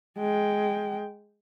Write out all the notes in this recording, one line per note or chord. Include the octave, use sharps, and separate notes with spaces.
G#3 G5